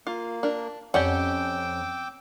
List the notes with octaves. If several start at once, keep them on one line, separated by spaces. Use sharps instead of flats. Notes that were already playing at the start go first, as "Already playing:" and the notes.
A#3 F4
D4 A#4
F2 C#4 G4 D5 F#5 G5 D6 E6